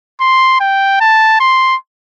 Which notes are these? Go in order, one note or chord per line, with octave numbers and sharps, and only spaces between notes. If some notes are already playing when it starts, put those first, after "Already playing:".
C6
G5
A5
C6